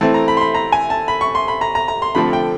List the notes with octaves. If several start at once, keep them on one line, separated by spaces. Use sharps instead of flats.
E3 A3 C4 A5
A#5
B5
C6
B5
A#5
G#5
A5
B5
C#6
C6
B5
A#5
A#5
A#5
C6
D3 F3 A3 C4 B5
G5